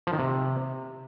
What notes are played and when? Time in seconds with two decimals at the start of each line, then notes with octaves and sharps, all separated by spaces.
0.07 F3
0.13 D#3
0.19 C3